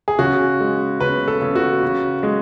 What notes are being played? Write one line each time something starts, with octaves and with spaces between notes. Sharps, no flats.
G#4
C#3 F#4
G#3
C#3 B4
A4
C#3
F#4
C#3
G#3